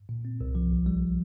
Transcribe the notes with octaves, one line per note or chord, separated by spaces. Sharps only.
A#2
C4
C2
F3
A#1
G3